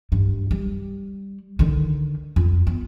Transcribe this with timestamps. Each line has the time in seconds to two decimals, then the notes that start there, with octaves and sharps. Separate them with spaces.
0.12 G2
0.51 G3
1.59 D3 D#3
2.36 F2
2.67 B3